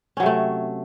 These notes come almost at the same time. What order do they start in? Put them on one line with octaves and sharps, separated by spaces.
C#4 F#3 C3 A3